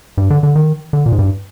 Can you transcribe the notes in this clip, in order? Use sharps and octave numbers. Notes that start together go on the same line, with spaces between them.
G2
D3
D3
D#3
D3
A#2
G#2
G2